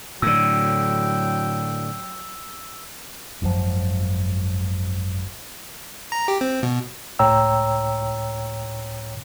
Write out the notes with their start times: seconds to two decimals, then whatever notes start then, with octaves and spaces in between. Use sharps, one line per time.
0.22 A2 D3 F#3 G5 E6
3.42 G#1 F#2 A2 F3
6.12 A#5
6.28 G4
6.41 C4
6.63 B2
7.19 C#2 A2 C#5 G5 A#5 E6